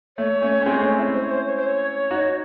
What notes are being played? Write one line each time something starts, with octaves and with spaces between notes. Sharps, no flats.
A3 C#5
A3 C#4
C#4
G#3 C4
A3 C#4
C#4 E4
C5
C#5
C5
C#5
C5
C#5
D#4 F#4